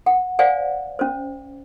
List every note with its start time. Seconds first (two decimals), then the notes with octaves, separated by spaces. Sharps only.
0.06 F#5
0.39 C5 D5 F5 F#5 G#5
0.99 C#4 C5